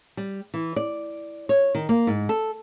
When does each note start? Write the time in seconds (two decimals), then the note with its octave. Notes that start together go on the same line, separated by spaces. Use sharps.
0.17 G3
0.54 E3
0.76 D5
1.49 C#5
1.75 D#3
1.89 A#3
2.07 G#2
2.29 A4